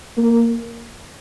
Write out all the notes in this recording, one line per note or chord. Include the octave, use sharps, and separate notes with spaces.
A#3